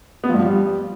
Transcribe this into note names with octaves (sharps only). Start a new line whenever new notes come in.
B3
F3
G2
F3
G3